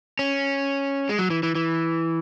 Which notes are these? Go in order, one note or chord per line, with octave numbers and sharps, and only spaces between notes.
C#4
G#3
F#3
E3
E3
E3